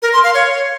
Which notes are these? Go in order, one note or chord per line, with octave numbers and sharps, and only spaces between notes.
A#4
C6
F5
C#5